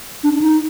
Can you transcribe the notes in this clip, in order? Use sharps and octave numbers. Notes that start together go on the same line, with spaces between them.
D4
D4
D#4